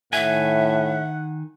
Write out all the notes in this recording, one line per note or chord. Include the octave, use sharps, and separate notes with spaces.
A2 D#3 E5 F#5 G#5